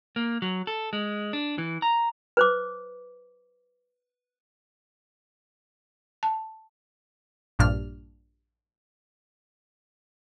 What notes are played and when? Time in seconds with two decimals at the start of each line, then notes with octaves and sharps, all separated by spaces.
0.16 A#3
0.42 F#3
0.67 A4
0.93 G#3
1.33 D4
1.58 E3
1.82 A#5
2.37 B4 C5 D6
6.23 A5
7.59 A#1 G2 A#2 D4 F6